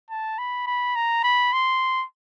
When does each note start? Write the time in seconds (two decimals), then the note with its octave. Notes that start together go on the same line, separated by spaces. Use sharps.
0.10 A5
0.39 B5
0.67 B5
0.96 A#5
1.24 B5
1.53 C6